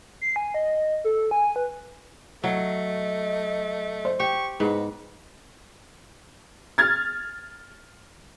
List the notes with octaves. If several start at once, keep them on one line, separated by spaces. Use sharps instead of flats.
C7
G#5
D#5
A4
G#5
B4
F#3 A3 D#5
C5
G4 C#6
G#2 B3 D#5
F6 G#6 A6